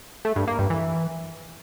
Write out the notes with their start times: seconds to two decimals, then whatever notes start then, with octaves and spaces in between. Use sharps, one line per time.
0.25 A3
0.36 G2
0.47 A#3
0.59 G2
0.70 E3